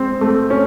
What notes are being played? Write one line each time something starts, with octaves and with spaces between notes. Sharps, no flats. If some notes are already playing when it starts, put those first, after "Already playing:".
Already playing: G#3 C4
A3
C#4